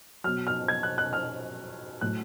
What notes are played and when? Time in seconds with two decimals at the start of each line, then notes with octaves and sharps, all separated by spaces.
0.24 B2 F#3 F6
0.47 F6
0.68 G#6
0.83 F#6
0.98 F#6
1.13 F6
2.01 A2 F#3 F#6